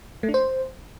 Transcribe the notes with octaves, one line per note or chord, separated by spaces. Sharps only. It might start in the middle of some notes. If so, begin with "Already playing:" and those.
A3
D4
C5